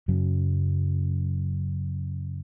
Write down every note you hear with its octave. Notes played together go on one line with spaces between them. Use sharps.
F#2 C#3 F#3